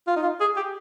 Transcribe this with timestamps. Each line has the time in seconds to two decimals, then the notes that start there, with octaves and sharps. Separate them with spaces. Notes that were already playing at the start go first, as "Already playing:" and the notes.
0.07 F4
0.16 D#4
0.23 F4
0.40 G#4
0.57 G4